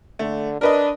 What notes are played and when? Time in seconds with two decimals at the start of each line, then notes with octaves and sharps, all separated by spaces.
0.19 D3 A3
0.61 D4 A#4 B4 D#5